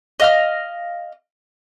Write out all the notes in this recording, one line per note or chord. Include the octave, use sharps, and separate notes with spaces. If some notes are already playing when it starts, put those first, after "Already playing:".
D#5 F5 F6